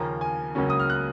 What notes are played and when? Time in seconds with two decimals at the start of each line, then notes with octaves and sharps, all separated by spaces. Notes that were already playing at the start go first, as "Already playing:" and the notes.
Already playing: D#2 C#3 F3 A#3 C#4 A#5
0.21 G#5
0.55 C#2 C#3 F#3 A#3 C#4
0.70 D#6
0.80 F6
0.90 F#6